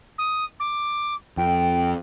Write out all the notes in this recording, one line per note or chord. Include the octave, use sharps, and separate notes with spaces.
D#6
D6
F2 G5